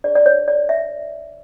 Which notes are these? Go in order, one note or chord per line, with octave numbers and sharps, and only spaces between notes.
D4 G#4 C#5 D5
D5
C#5
D5
E5